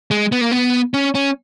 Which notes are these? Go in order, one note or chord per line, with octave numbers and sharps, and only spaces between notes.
G#3
B3
A#3
B3
C#4
C#4